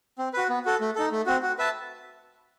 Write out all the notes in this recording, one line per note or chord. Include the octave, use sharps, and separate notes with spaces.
C4
F#4 B4
B3
F#4 A4
A3
D#4 A4
A3
C4 F#4
F#4
B4 E5 A5